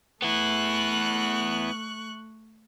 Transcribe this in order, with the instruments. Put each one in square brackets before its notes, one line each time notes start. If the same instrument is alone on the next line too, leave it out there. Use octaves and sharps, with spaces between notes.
[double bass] A3 [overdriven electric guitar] B3 E4 [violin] C#6 F#6